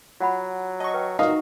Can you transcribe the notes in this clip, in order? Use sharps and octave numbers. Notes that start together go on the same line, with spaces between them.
F#3 F4 F#5 B5
D#5 A5 C#6
B4 G5
A#2 D#4 F#4 D#5 F5